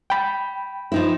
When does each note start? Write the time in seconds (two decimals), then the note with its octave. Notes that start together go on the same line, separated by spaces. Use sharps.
0.10 G5 B5
0.92 F3 D#4 E4